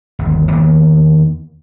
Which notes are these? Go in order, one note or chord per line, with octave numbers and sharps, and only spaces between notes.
G1 D#2
E2 D#3 A#3 B3